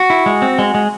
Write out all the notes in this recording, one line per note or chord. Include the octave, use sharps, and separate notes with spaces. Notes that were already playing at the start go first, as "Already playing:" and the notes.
Already playing: F#4
E4
G#3
C4
G#3
G#3